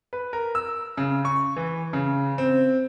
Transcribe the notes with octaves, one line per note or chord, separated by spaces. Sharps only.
B4
A#4
E6
C#3
C#6
E3
C#3
C4